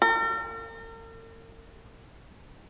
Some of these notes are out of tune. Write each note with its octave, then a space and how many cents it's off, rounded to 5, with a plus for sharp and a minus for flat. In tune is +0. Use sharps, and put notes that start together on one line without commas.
A#4 -45